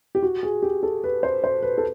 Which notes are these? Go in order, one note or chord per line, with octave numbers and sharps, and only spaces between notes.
G4
F#4
G#4
G4
A4
B4
C5
C5
B4
A4